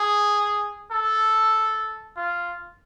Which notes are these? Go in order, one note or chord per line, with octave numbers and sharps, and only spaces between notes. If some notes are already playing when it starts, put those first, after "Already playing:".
Already playing: G#4
A4
F4